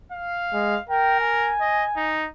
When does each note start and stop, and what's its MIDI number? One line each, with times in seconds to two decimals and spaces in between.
0.12 0.82 77
0.53 0.76 56
0.89 1.54 70
0.89 1.17 79
1.20 2.23 80
1.61 1.84 75
1.96 2.27 63